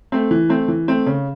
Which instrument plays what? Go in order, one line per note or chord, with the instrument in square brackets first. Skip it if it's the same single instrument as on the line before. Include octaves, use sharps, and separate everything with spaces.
[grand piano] A3 C4
E3
A3 C4
E3
A3 C4
C#3